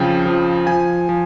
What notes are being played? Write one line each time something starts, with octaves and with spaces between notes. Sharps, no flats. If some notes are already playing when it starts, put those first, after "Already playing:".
Already playing: F2 C#3 F3 G5
F3
F3 G#5
F3